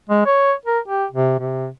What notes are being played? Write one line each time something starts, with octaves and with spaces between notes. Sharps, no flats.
G#3
C#5
A#4
G4
C3
C3